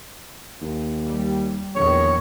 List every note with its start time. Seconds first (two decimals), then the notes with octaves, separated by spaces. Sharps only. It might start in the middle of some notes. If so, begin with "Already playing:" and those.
0.61 D#2
1.05 G3
1.75 A#1 E2 D#3 C#5